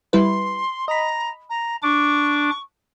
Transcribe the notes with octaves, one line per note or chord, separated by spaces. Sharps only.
G3 E4 B4 C6
D#5 A#5 B5
A#5
D4 C#6 D6